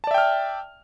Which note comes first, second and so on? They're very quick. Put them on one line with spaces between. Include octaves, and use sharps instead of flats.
A5 D5 E5 G5 F6